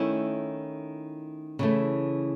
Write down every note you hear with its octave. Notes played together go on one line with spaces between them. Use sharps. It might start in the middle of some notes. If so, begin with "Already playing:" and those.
Already playing: D#3 A3 C#4 E4
C#3 E3 A3